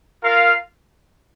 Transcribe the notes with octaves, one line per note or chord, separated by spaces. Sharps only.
F4 A#4 F5